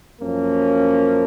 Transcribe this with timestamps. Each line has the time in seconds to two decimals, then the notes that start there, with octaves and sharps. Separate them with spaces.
0.21 F#2 F3 A#3 C#4